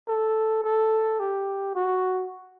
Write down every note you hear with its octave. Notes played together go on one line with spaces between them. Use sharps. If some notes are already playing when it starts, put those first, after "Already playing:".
A4
A4
G4
F#4